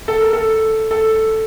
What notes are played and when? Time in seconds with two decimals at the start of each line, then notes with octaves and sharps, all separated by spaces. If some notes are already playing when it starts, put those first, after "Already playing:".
0.08 A4
0.21 A#4
0.33 A4
0.91 A4